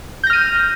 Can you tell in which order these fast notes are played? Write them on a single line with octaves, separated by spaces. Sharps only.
G6 A#6 F6 D#7